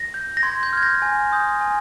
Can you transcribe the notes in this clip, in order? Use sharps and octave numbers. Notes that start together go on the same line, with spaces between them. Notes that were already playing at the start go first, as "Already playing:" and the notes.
Already playing: A#6
G6
A#6
C6 G#6
G6
F6 G#6
G6 A#6
G#5
C6 D#6 G6
G#5